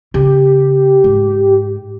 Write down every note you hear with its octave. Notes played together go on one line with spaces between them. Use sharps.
C#3 G4
G#2